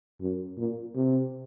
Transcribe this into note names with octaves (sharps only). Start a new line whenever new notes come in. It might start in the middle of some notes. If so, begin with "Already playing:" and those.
F#2
A#2
C3